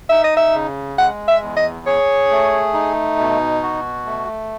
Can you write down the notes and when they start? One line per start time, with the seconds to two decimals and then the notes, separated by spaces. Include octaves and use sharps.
0.09 D#4 E5
0.24 D#5
0.37 E5
0.54 C#3
0.98 G#3 F#5
1.28 E5
1.42 E2
1.57 D#5
1.86 G#4 C#5
2.31 A3
2.74 D#4
3.18 B2
3.63 F#4
4.06 A3